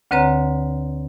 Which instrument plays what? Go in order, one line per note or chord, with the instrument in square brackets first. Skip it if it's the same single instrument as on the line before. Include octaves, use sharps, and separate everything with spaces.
[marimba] D2 D3 C4 B4 C#5 A#5